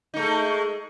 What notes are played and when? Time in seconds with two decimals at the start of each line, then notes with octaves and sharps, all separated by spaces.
0.14 D#4
0.16 A3
0.19 G#3